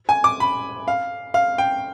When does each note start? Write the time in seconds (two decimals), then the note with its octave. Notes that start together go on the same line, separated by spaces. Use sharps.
0.09 G#5
0.24 D6
0.40 B5
0.88 F5
1.34 F5
1.58 G5